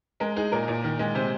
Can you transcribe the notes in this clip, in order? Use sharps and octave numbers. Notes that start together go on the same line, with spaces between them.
G#3 A#4
D#4 G#4
A#2 A#4
A#2
D#3
G#3
C3 C5